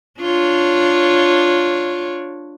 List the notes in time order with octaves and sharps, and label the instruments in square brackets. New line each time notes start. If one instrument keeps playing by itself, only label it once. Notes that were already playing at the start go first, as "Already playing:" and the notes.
[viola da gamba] D4 F4 C#5